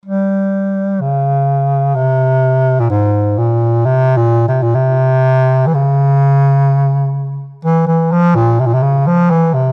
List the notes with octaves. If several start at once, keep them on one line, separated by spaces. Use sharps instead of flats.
G3
C#3
C3
A#2
G#2
A#2
C3
A#2
C3
A#2
C3
E3
C#3
E3
E3
F3
A#2
C3
A#2
C3
C#3
F3
E3
C3